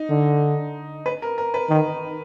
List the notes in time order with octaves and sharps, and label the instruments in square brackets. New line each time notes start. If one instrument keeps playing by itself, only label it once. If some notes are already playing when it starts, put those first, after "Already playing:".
Already playing: [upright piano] D#4
[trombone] D3
[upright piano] B4
A#4
A#4
B4
[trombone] D#3